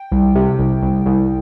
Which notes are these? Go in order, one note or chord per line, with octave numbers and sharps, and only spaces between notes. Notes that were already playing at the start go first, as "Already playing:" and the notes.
Already playing: G5
C2
C3
C2
C2
C2